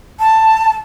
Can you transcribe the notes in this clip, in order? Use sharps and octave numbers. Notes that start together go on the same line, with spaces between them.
A5